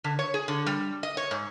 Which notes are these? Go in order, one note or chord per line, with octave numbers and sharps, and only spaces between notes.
D3
C#5
G#4
D3
G3
D#5
C#5
G#2